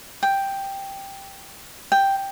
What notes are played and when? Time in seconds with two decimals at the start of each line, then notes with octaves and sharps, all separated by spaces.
0.23 G5
1.92 G5